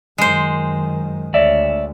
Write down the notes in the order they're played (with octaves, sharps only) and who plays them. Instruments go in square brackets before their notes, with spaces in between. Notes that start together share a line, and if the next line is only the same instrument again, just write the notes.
[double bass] F#2 D#3 [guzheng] G#3 C5
[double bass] D2 [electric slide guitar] C#5 D5 E5